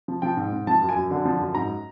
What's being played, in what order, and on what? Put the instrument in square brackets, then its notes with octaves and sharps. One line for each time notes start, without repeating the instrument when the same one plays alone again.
[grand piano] F3
F3 G5
G#2
G#2
F3 A5
F#2
G#5
F#2
D3
F3
F#2
G#2 A#5